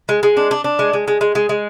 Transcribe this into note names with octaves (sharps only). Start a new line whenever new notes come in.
G#3
G#3
D4
D4
D4
G#3
G#3
G#3
G#3
G#3
G#3